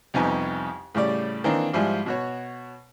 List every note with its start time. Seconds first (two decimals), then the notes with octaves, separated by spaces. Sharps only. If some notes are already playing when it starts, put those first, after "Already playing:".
0.14 C2 F2 B3 D#4 G4 G#5
0.95 A2 C#3 G3 D5
1.44 D#3 E3 A#3 C4 D4 D#4
1.73 G#2 F3 G3 E4 F4 G#5
2.06 B2 F#4 C#5